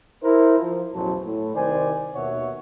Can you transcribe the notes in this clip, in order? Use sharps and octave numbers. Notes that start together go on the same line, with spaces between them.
E4 A#4 C5
F3
A1 E2 B2 F#3 C5 A5
A2
C2 D#3 C5 D5 G#5
D#2 B2 D#3 C#5 E5 F#5